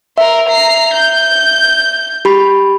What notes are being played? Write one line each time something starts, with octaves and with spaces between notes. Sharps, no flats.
A#4 E5 C6
A#5 C7
G6
G4 B5